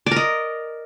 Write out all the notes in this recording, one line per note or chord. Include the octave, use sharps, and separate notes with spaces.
A#4 D5 D#5